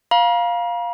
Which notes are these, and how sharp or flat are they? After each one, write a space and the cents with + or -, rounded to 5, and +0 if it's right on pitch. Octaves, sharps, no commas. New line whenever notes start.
F5 +5 A#5 +45